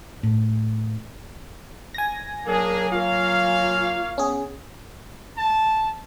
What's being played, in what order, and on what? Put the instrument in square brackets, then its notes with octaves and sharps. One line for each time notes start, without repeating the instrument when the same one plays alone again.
[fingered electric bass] A2
[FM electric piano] G#5 A#6
[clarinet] F#3 [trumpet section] A#3 D4 G#4 [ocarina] A#4
[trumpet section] A#3 C#5 F5 [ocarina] F4
[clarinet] B3 [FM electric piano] C#4 G#4
[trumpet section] A5